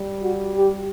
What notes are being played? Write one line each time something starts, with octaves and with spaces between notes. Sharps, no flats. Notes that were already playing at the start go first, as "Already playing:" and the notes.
Already playing: G3
F#4
G4